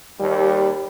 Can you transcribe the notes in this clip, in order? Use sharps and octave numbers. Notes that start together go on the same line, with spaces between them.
D#2 G3